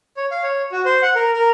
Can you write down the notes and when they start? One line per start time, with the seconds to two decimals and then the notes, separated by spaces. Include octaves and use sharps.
0.17 C#5
0.31 F5
0.43 C#5
0.72 F#4
0.85 C5
1.02 F#5
1.15 A#4
1.34 A#4